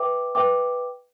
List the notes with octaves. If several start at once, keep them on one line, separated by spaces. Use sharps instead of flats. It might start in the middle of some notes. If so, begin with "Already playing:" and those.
Already playing: B4 E5 G5 D6
B4 E5 G5 D6